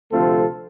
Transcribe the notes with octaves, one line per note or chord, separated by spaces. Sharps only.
D2 C3 F3 A3 C4 F4 A4